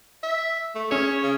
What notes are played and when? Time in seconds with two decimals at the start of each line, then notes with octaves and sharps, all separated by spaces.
0.23 E5
0.75 A3
0.91 C#4 G#4 C#5
1.23 C#3